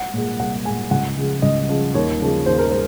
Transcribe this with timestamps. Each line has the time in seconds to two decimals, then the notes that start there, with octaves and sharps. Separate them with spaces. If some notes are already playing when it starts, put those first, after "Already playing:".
Already playing: F#5
0.14 A#2 G#3
0.39 C2 F#5
0.65 A#2 G#3 G#5
0.91 C#2 F#5
1.17 C#3 F3 G#3
1.42 C#2 D#5
1.69 C#3 F3 G#3
1.94 D#2 C#5
2.21 C#3 F3 G#3
2.46 D#2 C5
2.59 A#4
2.71 G#3 C5